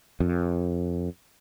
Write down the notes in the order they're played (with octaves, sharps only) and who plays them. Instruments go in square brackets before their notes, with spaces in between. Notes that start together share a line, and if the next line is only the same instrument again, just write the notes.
[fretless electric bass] F2